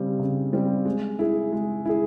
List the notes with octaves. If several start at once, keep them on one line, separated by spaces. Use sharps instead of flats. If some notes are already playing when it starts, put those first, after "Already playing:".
Already playing: C#3 G3 C4 G4
C#3
G3 C4 G4
G#3
E4 G#4
G#3
E4 G#4